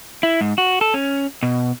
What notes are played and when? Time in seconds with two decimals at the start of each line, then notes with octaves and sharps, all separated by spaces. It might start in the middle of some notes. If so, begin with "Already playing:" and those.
0.23 E4
0.41 G#2
0.58 F#4
0.81 A4
0.94 C#4
1.43 B2